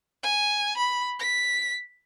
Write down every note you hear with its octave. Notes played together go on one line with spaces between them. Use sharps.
G#5
B5
B6